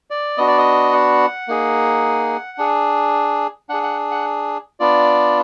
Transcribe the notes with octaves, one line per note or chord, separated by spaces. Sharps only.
D5
B3 D4 F#4 D#5
D5
D#5
F#5
A#3 D#4 G#4
D4 G#4
D4 G#4 F#5
F#5
F#5
B3 D4 F4 D5